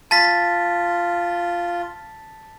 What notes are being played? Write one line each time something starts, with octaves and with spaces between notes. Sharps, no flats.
F4 A5 A6 B6